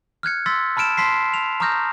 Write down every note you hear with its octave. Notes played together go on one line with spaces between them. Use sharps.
F6 F#6 G#6 C#7
C6 E6 A6 B6
A5 B5 F6 D7 E7
A5 C6 B6 C7
F7
A#5 C#6 D#6 F6 G6 A#6